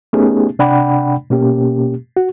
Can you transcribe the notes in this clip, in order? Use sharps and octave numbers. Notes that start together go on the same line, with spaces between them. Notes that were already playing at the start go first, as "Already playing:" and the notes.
A3 B3 C#4 D#4 G4 G#4
C3 D4 D5 F#5 G5 B5
B2 A#3 C#4 G4
F#4